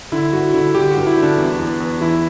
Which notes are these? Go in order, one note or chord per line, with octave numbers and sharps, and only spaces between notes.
D3 E4
G2 F#4
D3 E4
D3 G4
F#4
G2
E4
D3
D4
E2
E2
E2
E3 E4